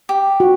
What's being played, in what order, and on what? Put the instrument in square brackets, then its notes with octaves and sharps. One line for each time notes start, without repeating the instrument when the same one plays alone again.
[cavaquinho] G4
[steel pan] F#4